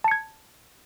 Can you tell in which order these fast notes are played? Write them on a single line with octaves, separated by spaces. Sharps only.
A5 C#7 G#6